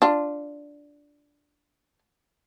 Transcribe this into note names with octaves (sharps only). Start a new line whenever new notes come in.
D4 F4